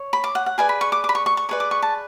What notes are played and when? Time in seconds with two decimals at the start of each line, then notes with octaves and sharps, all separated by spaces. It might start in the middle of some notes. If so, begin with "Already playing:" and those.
Already playing: C#5
0.13 B5
0.24 D6
0.35 F#5
0.46 F#5
0.58 G#4 B4 D5 G#5
0.69 B5
0.81 C#6
0.92 D6
1.04 D6
1.09 B5
1.15 C#6
1.26 C#6
1.37 C#6
1.49 G#4 B4 D5 C#6
1.60 D6
1.71 C#6
1.82 A5